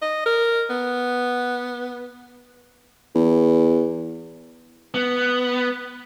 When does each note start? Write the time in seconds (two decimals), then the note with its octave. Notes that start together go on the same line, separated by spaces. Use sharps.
0.02 D#5
0.26 A#4
0.70 B3
3.15 E2
4.94 B3